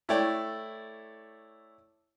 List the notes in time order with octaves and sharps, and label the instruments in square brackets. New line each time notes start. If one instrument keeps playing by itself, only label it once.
[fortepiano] A3 E4 A4 C#5 D5 G5